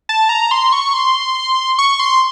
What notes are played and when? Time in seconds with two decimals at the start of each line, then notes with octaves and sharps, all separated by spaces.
0.09 A5
0.29 A#5
0.51 C6
0.73 C#6
0.94 C6
1.79 C#6
2.00 C6